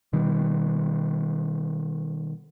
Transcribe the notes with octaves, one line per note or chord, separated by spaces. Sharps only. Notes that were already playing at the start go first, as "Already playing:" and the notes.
B2 D#3 G3